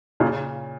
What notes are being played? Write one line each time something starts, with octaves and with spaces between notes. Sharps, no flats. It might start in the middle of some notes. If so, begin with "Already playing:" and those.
A#2 C#3